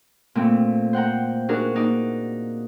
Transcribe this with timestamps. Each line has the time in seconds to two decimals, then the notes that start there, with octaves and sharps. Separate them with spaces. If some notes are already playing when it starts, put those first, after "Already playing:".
0.35 A#2 A3 C4
0.93 C5 F#5 G5 A#5
1.49 D4 D#4 F#4 G#4 A#4
1.74 A#3 D#4 D5 D6